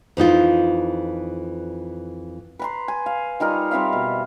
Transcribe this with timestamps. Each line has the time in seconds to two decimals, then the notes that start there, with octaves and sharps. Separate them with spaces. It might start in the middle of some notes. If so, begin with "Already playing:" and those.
0.17 F2 E3 D#4 F4
2.59 B4 A#5 C6
2.88 G#5
3.06 F5
3.40 G3 D#4 F4 A#4
3.71 G3 C4 E5 F5
3.93 B2